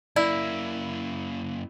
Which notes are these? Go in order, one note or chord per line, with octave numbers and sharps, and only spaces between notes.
F#2 A#3 E4 D5